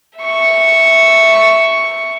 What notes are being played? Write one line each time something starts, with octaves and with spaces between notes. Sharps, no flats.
E5 C#6